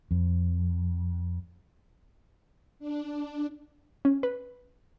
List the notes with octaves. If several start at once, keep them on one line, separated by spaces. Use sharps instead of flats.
F2
D4
C#4
B4